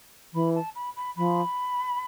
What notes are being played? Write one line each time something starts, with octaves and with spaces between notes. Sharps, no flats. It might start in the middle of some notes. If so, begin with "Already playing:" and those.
E3 B5
A5
B5
B5
F3 B5